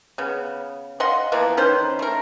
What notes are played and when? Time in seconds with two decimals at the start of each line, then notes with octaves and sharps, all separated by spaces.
0.18 C#3 B3
1.00 D#5 F5 F#5 C6
1.32 E3 F3 A#3 B3
1.57 D#3 C#4 B4 C5
1.99 A3 A#4